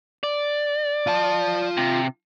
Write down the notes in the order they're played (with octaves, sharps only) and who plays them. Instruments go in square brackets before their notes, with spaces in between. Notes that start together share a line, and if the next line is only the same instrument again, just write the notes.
[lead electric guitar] D5
[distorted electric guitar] F4 A5
[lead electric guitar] C3